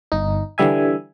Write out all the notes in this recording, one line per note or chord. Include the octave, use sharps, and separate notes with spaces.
G1 D#4
D3 E3 G3 E5 G#5